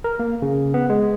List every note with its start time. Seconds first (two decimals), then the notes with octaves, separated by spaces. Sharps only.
0.04 A#4
0.19 A#3
0.42 C#3
0.74 B3
0.90 G#3